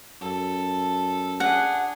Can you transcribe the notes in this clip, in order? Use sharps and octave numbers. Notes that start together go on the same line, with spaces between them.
F#2 A4
D4 G#4 F#5